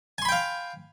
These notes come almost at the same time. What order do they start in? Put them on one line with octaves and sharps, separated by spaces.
G#5 C6 B5 G5 F5